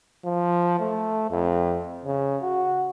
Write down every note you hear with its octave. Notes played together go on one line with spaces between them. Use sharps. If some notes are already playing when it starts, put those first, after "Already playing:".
F3
A3
F2
C#3
F#4